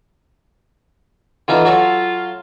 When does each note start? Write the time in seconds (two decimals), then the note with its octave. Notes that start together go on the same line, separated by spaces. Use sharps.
1.48 D3 E3 D#4 F4
1.65 F#3 F#4 A4